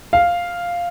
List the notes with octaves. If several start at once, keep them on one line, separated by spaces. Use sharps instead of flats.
F5